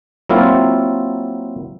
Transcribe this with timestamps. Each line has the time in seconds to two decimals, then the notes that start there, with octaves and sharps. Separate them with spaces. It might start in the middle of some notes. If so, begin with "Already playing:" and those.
0.29 F#3 A#3 C4 E4 F4